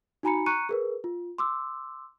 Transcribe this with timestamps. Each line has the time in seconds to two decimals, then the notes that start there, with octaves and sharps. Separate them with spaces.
0.23 D#4 F#4 G#5 A#5 B5 C#7
0.46 A#5 C#6 F#6 C#7 D#7
0.69 G#4 A#4 B4
1.04 F4
1.38 C6 D6 E6